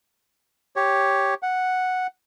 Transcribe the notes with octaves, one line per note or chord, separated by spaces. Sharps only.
G4 C#5
F#5